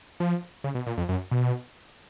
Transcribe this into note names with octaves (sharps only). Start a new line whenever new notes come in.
F3
C#3
B2
A#2
F2
F#2
B2